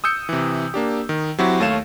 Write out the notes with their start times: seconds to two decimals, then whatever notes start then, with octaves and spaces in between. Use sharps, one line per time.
0.04 D#6 E6 G6 C#7
0.29 C3 E3
0.74 A#3 D4 G4
1.09 D#3
1.39 F#3 C4 E4 F#4 G4
1.60 D#2 A3 C#5 F5 E7